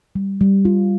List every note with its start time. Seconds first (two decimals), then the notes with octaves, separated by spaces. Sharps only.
0.15 G3
0.41 G3
0.65 F4